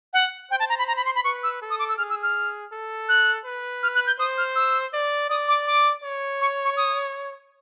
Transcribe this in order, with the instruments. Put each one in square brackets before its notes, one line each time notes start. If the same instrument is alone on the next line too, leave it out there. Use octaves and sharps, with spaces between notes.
[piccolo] F#5
[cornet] C5 [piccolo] G5
[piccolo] A5
A#5
B5
A#5
B5
C6
B5
[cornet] B4 [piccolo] C#6
[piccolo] E6
[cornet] A4
[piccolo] D#6
D6
E6
[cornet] G#4 [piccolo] F6
[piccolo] E6
F6
[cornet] A4
[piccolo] F#6
[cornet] B4
[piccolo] F6
F#6
G6
[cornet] C5 [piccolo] D#6
[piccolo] F6
E6
[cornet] D5
[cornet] D5 [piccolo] D#6
[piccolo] D6
D6
[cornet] C#5
[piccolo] C#6
C#6
D#6